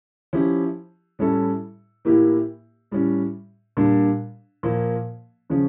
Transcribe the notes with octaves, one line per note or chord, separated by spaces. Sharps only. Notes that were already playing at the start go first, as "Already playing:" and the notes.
F3 C#4 E4 G4
A2 G3 C#4 E4 A4
A2 E3 A#3 E4 G4
A2 G3 C#4
A#2 G3 D4
A#2 F3 A#3
C#3 F3 C#4